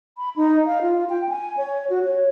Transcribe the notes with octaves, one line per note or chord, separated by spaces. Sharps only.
B5
D#4
F5
F4
G5
G#5
C#5
F#4
C#5